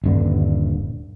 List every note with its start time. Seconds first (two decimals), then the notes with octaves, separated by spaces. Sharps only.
0.04 D#1 G2 D3